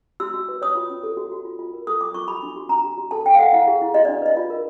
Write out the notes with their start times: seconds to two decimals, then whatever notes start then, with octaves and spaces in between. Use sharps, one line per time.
0.20 F#4 E6
0.34 F#4
0.49 B4
0.62 C#5 D#6
0.75 F4
0.90 C#4
1.04 A4
1.17 F#4
1.32 F#4
1.45 F4
1.59 F4
1.74 A#4
1.87 A4 D#6
2.01 A4 D6
2.14 F4 C#6
2.28 F#4 B5
2.43 D4
2.56 F#4
2.69 D4 A#5
2.84 F#4
2.98 F#4
3.11 A4 A5
3.25 C#5 G5
3.35 F5
3.39 A4 F#5
3.53 E4 F5
3.67 G#4
3.81 E4
3.94 F#4 D#5
4.05 D5
4.09 D4
4.22 B4 D#5
4.37 F4
4.50 A#4